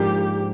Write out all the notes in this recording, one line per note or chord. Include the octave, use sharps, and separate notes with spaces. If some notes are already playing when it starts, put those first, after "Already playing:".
Already playing: G#2 F3 A#3 D4 G4